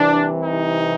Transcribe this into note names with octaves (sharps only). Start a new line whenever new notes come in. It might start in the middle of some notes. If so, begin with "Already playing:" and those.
Already playing: C2 C3 E3 D4
D#4